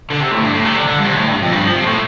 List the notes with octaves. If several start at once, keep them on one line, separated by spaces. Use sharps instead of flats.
D3
C3
A2
G2
A2
C3
D3
D3
G2
C3
A2
G2
F2
G2
F3
C3
A2